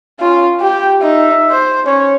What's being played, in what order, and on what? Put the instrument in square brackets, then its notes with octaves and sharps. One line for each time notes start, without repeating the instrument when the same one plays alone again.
[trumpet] C#4 [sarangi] F4
[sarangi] G4 [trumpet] G5
[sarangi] D#4 [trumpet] E5
[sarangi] C5
[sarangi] C#4 [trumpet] C#5